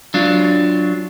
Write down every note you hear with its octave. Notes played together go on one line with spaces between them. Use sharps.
F#3 D4 F4